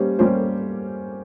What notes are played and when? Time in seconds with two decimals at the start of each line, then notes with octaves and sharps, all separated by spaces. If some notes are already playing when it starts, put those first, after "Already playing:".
Already playing: G3 A#3 C#4 G4 C5
0.19 G3 A#3 C#4 G4 C5